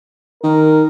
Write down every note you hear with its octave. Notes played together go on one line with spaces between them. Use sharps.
D#3 A#4